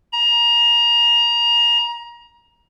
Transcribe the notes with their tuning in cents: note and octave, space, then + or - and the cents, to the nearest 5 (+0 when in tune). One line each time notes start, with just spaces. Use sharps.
A#5 +25